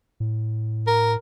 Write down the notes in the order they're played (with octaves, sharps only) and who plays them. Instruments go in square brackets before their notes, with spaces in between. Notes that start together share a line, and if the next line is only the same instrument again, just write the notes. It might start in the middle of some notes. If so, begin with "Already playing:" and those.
[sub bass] A2
[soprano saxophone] A#4